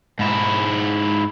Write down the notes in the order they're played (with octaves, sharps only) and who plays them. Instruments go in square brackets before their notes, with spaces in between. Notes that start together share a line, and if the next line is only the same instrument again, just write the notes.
[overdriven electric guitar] G#2 E4